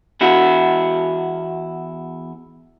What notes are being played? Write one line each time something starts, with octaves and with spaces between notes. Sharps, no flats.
E2 E4 F#4